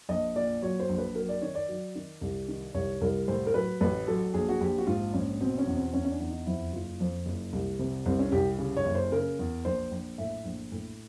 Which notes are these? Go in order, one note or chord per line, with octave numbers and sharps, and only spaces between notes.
A#1 D#5
A#2 D5
F#3 C#5
C5
A#1
B4
F#3 A#4
D5
D#3 C#5
D5
F#3
D#3
C2
D#3
C2 C#5
C2 A#4
A2 C5
A#4
F#3 B4
A1 B4
F#3 A4
A#1 G#4
F#4
A#1 G4
F#4
G#2 F4
A#1 C#4
B2 C4
C#4
E2
C4
E2 C#4
C#4
D4
E2
D#4
F2 E4
F#1 F4
F2
F#1
C2
C3
C2 C4
C#4
C2 G4
C#3
C#5
F#1
C5
C#3 A#4
E2
A#1 C5
A#1
A2 E5
A#1
A2